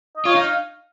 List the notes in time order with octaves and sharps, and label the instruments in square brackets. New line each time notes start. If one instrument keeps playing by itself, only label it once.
[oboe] D#5
[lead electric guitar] F4 [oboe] C#5
[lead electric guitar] D#4
[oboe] F5